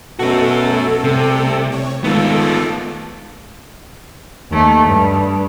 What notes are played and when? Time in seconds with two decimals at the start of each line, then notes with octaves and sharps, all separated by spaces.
0.19 B2 A3 C#4 F#4 A4
1.04 C2 C3
1.72 C#5
2.04 D#3 G#3 A3 B3 F4 A4
4.50 D#2 A3
4.86 G2